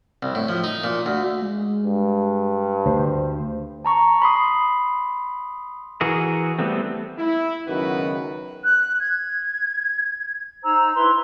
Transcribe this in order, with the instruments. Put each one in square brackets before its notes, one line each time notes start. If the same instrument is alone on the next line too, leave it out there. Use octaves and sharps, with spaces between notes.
[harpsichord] C2
A2
F3
D#4
A#2
D2
[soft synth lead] G#3
[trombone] G2
[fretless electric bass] D2 [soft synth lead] C5
[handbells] A5 A#5 C#6
B5 C6 D#6
[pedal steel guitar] E3 F#4 G#4 A#4
G3 A3 B3 C4
[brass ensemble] E4
C#2 F#2 D#3 B3 F#4 B4
[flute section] F#6
G#6
D#4 C5 A#5 E6
E4 B4 C6